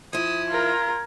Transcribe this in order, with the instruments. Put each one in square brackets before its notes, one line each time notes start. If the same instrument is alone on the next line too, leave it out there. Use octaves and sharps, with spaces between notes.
[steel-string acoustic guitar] F3 E4 [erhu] D#6 [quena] G#6
[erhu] F4 [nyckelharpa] A#4 A#5